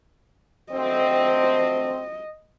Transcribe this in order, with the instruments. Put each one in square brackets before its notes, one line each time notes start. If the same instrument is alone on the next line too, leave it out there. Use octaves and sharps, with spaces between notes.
[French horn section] D2 A3 C4 [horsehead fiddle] D#5